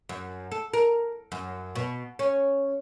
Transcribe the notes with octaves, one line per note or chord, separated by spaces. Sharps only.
F#2
A4
A#4
F#2
B2
C#4